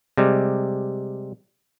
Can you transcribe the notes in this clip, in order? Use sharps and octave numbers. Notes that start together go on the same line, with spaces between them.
C3 G3 G#3